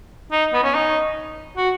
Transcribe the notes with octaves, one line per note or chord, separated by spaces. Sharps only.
D#4
B3
C#4
D#4
F#4